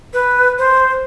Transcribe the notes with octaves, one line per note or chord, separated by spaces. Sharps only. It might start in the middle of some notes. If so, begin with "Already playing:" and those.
B4
C5